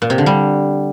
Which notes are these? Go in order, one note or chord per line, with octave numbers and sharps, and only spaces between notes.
A#2
C3
D3
G3